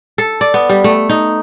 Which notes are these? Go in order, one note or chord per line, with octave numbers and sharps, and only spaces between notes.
A4
D5
B3
G3
A3
D#4